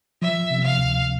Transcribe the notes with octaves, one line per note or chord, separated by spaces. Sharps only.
F3 E5
C3
F5
D2